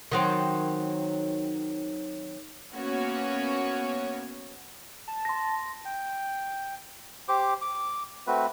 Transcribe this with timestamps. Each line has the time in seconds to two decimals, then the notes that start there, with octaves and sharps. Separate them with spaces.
0.11 D#3 F#3 C4
2.72 A#3 B3 C#4 F#4 C#5
5.08 A5
5.25 C6 A#6
5.85 G5
7.28 G4 C5 D6
7.61 D6
8.27 A3 C4 F#4 B4